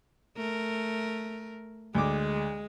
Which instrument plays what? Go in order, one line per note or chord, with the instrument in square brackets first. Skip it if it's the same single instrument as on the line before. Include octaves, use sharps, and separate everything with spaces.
[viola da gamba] A3 A#4
[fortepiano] D2 D6 [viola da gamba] G#3